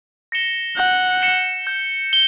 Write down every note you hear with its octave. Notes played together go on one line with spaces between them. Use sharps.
A#6 C#7 E7 G7
F#5 G6
A#6 C#7 E7 G7
G6
G7